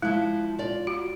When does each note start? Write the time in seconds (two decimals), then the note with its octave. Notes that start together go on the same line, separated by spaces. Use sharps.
0.02 F3 G#3 E4
0.59 F4 D5
0.87 F#4